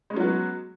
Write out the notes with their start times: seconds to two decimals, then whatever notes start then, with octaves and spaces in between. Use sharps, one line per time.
0.10 G#3
0.13 C#4
0.16 F#3
0.20 F#4
0.23 B3